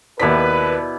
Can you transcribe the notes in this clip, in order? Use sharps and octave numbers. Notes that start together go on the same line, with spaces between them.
D#2 B2 E4 B4 D5 B6